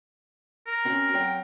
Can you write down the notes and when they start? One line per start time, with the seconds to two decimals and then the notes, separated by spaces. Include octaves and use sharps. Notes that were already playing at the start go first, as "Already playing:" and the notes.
0.67 A#4
0.85 C4 C#4 F#4
1.14 F#3 C4 G5